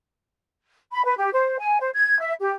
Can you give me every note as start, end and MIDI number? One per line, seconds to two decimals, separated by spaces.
0.91 1.04 83
1.04 1.14 71
1.17 1.30 67
1.33 1.56 72
1.59 1.78 80
1.80 1.89 72
1.94 2.18 92
2.19 2.34 76
2.41 2.52 67